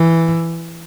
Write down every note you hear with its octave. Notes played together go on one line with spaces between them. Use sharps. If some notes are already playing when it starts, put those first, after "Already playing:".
Already playing: E3